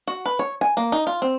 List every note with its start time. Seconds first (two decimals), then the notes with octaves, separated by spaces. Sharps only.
0.07 F#4
0.26 B4
0.39 C#5
0.61 G#5
0.77 A#3
0.92 D#4
1.07 F4
1.22 C4